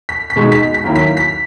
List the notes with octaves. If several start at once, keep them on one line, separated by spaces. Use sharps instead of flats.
B6
B6
B2 G#3 D#4
B6
B6
D#2 D#3 F#3 A#3 E4
B6
B6